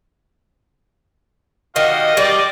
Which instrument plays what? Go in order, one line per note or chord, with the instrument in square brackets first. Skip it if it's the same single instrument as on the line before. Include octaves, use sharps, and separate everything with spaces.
[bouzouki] D#3 [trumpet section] G3 F#4 F5 [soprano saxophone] D#5
[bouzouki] G3 [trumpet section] C4 D5